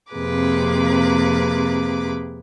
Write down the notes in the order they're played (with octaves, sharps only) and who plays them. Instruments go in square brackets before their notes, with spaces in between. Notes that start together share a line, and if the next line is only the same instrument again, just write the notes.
[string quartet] F2 C3 A#3 G#4 B4 D6